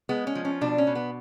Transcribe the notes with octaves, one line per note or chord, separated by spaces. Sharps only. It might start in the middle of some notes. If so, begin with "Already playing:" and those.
G#3 B3
C#4
F3
C#4
B2 D4
C#4
B2
B3